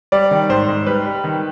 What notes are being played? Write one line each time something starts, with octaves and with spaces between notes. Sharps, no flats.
G3 D5
D#3
G#2 C5
G#2
G3 B4
G3
D#3